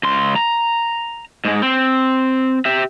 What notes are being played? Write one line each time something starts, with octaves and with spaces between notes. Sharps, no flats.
C#2 C6
A#5
G#2 G#3
C4
G4 E5